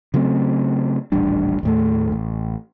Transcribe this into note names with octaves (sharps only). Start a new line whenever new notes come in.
C#3 F#3 A3 C4
D#1 A1 G3 D4
D#2 A2 A3
A1